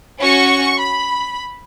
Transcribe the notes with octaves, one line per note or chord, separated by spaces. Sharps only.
C#4 F#4 C#6
B5